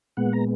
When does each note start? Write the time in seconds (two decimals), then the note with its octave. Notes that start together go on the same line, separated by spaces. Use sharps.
0.17 A#2 G#3 B3 F#5
0.33 A#5